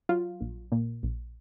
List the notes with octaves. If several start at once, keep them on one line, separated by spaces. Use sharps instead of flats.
F#3 F4
A#1
A#2
A#1